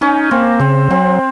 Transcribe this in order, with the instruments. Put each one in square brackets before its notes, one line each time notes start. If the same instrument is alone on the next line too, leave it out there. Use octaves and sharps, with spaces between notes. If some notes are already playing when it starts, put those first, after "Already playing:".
[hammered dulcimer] C#4 [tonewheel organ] D#4
[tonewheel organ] A#3 [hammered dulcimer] C4
[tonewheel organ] C#3 [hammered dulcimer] C4
[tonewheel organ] F#3 [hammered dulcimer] C4